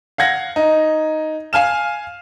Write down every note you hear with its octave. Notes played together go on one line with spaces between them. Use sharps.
F5 F#5 G#6 A#6
D#4
F5 G#5 F6 E7